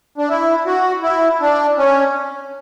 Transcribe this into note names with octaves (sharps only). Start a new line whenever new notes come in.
D4
E4
F#4
E4
D4
C#4